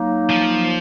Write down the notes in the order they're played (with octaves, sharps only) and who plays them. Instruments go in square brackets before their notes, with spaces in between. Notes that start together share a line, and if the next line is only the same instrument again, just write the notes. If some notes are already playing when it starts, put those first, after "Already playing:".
Already playing: [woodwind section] F#3 A#3 D#4
[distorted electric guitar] F3